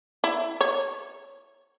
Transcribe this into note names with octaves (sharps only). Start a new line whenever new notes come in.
E4
C#5